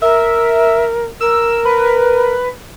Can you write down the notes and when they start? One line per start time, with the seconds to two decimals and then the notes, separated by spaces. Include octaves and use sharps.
0.02 A#4 E5
1.21 A#4 E6
1.65 B4